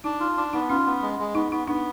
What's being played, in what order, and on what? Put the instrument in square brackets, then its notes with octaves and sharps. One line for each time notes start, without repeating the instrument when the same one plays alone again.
[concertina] D4 [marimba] D#4
[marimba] D#4 [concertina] F4
[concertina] D4
[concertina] B3 [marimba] D#4
[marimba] C#4 [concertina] F4
[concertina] B3
G#3
G#3
[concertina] B3 [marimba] D#4
[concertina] B3 [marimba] D#4
[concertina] B3 [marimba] D4